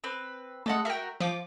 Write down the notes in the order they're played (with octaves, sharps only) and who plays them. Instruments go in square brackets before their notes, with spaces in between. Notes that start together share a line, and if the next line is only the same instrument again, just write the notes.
[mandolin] C4 B4
[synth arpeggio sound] G#3 A3 [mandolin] A4 D#5 F#5
[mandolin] F#4 A#4 [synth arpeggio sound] E5 G5
[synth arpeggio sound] F3 D6 [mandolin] F4